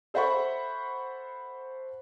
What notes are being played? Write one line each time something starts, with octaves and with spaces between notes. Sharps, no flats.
A4 C5 E5 F#5 B5 C#6